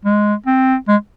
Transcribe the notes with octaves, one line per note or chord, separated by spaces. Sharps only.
G#3
C4
G#3